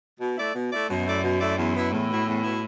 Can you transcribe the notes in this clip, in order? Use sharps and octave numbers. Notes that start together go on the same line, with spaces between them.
B2
A3 E4 D5
B2
A3 E4 D5
F#2 B2
A3 E4 D5
B2
A3 E4 D5
E2
B2 B3 E4
E2 A2
B2 B3 E4
E2
B2 B3 E4